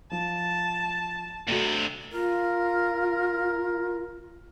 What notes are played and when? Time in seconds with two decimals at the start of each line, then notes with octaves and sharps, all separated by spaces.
0.11 F3 A5
1.48 G2 C3 A3 F#4
2.12 F4 A#4